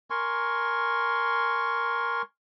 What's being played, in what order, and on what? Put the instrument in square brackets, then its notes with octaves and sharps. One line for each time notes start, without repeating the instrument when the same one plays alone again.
[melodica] A#4 G#5 C6 C#6